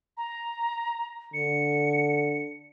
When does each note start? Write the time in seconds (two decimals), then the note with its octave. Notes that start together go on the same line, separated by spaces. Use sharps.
0.17 A#5
1.34 D3 C#7